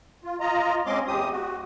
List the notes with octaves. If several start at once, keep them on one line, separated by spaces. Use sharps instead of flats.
F4
F4 D#5 A#5
G#3 C4 C#4 D#5 C6 D6
E2 G4 D#6
F#4